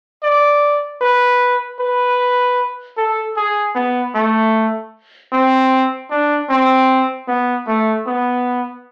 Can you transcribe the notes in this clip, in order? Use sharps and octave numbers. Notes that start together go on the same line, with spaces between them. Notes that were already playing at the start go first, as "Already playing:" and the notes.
D5
B4
B4
A4
G#4
B3
A3
C4
D4
C4
B3
A3
B3